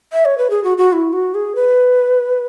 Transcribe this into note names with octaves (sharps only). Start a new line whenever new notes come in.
E5
C#5
B4
G#4
F#4
F#4
E4
F#4
G#4
B4